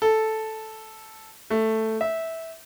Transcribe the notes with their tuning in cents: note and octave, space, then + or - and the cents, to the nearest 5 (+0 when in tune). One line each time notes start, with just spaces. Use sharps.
A4 -5
A3 +5
E5 -15